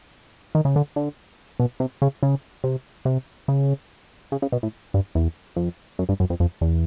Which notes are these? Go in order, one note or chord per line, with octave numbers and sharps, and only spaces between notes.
D#3
C#3
D3
D3
B2
C3
C#3
C#3
C3
C3
C#3
C#3
C#3
B2
A2
G2
E2
F2
F#2
G2
F#2
F2
F2
E2